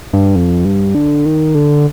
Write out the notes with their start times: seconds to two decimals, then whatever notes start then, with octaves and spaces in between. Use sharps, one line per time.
0.13 G2
0.36 F2
0.65 G2
0.95 D3
1.26 D#3
1.55 D3